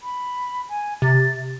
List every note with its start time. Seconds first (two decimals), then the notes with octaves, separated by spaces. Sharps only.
0.03 B5
0.69 G#5
1.02 C3 A6